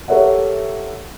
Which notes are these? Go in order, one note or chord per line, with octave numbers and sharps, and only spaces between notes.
G4 A4 A#4 C#5 E5 F#5